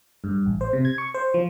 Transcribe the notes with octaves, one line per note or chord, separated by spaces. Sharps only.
G2
A1
C5
C3
G#6
C#6
C5
F3